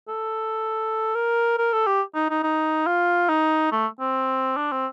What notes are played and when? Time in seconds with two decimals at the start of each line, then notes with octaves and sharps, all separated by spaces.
0.09 A4
1.15 A#4
1.58 A#4
1.73 A4
1.87 G4
2.15 D#4
2.30 D#4
2.44 D#4
2.87 F4
3.29 D#4
3.72 A3
4.00 C4
4.57 D4
4.72 C4